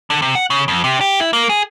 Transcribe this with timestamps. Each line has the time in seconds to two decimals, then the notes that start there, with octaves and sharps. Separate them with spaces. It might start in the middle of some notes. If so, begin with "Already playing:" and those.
0.10 D3
0.22 C3
0.35 F#5
0.50 C#3
0.68 F2
0.84 C3
1.01 G4
1.20 E4
1.33 A#3
1.49 G#4